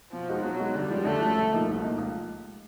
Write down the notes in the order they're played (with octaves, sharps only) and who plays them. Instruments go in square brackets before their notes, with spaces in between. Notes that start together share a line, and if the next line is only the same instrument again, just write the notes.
[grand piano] B2 [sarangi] F3
[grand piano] G#3 B3 D#4 F#4
[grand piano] B2 [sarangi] F#3
[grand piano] G#3 B3 D#4 F#4
[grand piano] D3 [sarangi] G3
[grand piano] F3 G#3 C#4
[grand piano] D3 [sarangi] A3
[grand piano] F3 G#3 C#4
C2
A#2 F3 A#3 D#4
C2
A#2 F3 A#3 D#4
C#2